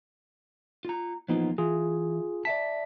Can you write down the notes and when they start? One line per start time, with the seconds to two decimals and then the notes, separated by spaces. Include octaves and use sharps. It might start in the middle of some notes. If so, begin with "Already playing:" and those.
0.85 F4 A#5
1.28 E3 F3 A#3 B3 D#4 F4
1.58 E3 F4 G#4
2.45 D5 E5 A5 B6